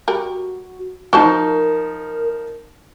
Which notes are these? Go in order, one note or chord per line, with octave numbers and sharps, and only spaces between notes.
G3 F#4 A#4
F3 D#4 F#4 A#4 C5 A5